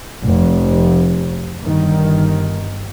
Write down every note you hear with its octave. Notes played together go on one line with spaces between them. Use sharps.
F1
G1 D#3